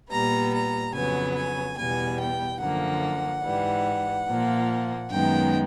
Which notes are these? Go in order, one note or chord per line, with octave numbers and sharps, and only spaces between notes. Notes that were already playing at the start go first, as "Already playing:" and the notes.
A#2 G3 B3 A#5
A#5
F2 C#3 F#3 B3 G#5
G#5
E2 B2 G3 B3 G#5
G5
F#2 D3 F3 A#3 F#5
G#2 E3 G3
A#2 F3 A#3
F#2 D#3 G#3 B3 G5